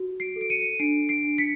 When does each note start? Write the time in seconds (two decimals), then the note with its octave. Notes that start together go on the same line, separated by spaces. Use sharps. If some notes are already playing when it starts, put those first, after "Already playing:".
Already playing: F#4
0.20 C7 D7
0.36 A4
0.41 D7
0.50 C#7 D#7
0.79 D4 C7 D7
1.09 C7 D7
1.24 D4
1.38 B6 C#7